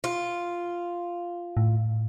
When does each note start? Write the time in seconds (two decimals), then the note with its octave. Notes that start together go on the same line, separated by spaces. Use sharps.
0.04 F4
1.57 A2